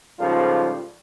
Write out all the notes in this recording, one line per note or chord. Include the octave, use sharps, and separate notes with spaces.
G#2 C#3 F3 G3 F4 A4